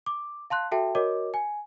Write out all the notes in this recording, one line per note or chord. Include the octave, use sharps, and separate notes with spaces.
D6
F5 A5 C6 F#6
F#4 A4 E5 G5 A5
F#4 A#4 C#5 D#5 D6
G#5